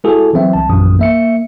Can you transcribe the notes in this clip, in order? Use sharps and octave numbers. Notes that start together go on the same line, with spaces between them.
G#3 E4 F#4 G#4 A4
E3 F#3 C4 E5
C2 A5
A#1 F#2 E3 D#6
A#3 E5 C#7